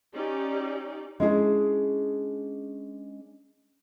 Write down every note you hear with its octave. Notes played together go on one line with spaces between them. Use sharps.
C#4 D#4 G4 D5
G#3 C#4 D4 E4 G#4 A#4